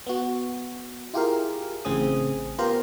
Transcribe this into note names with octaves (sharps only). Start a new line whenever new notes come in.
B3 F#4
E4 F4 G4 G#4 A#4 F5
A1 A2 C#3 C4 G#4 D#6
B3 F4 G4 A#4 C5 A#5